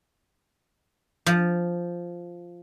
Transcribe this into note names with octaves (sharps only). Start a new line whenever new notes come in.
F3